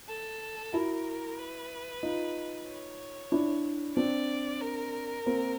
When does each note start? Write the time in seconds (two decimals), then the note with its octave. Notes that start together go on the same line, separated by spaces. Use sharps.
0.09 A4
0.73 E4 F#4 A#4
1.38 B4
2.03 D#4 F4
2.67 C#5
3.32 D4 E4
3.96 C4 D4 D5
4.61 A#4
5.26 A#3 C4